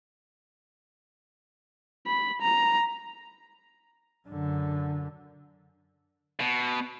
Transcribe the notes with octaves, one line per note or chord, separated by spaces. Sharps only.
B5
A#5
F#2 D3
B2